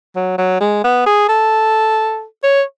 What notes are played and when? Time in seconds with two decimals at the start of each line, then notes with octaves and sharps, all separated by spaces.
0.16 F#3
0.38 F#3
0.60 G#3
0.84 B3
1.07 G#4
1.29 A4
2.44 C#5